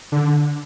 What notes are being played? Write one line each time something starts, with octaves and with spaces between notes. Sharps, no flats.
D3